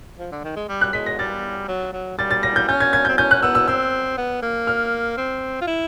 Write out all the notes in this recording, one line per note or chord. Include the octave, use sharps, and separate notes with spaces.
F3
D3
D#3
G#3
G3
F#6
G#3 B6
A#6
G3 A6
F#3
F#3
G3 A6
A6
A#6
G6
C#4 G6
G#6
G#6
C4 G6
C#4 G6
F#6
B3 E6
E6
C4 E6
B3
A#3
F6
C4
F4
E4